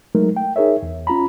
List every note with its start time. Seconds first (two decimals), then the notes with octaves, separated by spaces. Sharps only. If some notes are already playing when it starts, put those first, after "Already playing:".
0.15 F#3 G#3 A3 D#4 A#4
0.36 G5
0.56 D#4 G#4 A#4 C#5 E5
0.83 E2
1.07 C#4 F4 A#5 B5